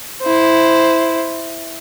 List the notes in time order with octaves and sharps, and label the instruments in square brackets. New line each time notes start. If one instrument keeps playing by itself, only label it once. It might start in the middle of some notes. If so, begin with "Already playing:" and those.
[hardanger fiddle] E4 C5